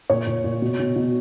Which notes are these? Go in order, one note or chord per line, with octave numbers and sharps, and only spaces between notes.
A#2 C#5
A#2
A#2
B2
B2
B2